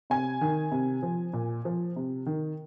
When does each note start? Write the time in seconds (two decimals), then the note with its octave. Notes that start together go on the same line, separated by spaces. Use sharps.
0.10 C3 G#5
0.41 D#3
0.72 C3
1.03 F3
1.33 A#2
1.65 F3
1.96 C3
2.26 D#3